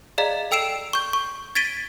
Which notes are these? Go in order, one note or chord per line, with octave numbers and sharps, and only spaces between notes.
G#4 D5 D#5 F5 A#5
A4 G5 E6 C7 D7 E7
C#6 G6
C#6
G#6 A6 B6 D7 D#7 G7